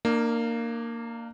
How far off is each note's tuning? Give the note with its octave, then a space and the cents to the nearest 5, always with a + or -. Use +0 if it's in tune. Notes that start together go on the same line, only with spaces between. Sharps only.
A#3 -10 D4 +40